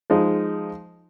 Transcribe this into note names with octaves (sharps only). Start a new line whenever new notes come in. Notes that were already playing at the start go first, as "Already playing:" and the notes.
F3 G#3 D#4